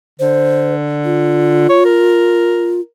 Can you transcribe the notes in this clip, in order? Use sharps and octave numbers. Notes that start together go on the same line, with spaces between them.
D3 C5
F4
C#5
A#4